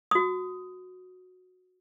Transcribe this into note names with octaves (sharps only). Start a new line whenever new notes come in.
F#4 D#6